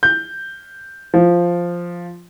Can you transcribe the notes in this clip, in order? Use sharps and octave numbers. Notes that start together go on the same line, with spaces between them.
G6
F3